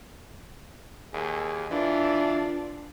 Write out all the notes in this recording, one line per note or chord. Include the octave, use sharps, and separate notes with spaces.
D#2 G#4
E3 D4 F4